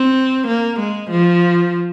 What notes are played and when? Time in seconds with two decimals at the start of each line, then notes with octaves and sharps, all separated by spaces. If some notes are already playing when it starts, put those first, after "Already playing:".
Already playing: C4
0.48 A#3
0.79 G#3
1.10 F3